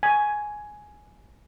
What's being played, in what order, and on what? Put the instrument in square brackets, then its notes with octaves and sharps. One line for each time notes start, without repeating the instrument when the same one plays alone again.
[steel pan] G#5